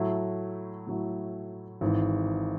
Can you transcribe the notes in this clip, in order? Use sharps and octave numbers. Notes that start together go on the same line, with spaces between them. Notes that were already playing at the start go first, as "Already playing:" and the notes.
Already playing: A2 F#3 A3 E4
A2 F#3 A3 E4
G#1 G#2 E3